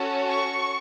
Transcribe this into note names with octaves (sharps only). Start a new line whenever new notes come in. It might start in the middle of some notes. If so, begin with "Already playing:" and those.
Already playing: C#4 F#4 A4
C#6